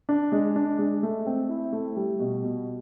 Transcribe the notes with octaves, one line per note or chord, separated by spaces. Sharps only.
D4
G#3
D4
G#3
A3
C4
E4
A3
G3
B2
B2